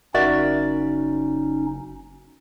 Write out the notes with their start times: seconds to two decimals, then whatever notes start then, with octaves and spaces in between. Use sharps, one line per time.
0.15 F#1 C#4 D#4 F#4 A#4 D5 E5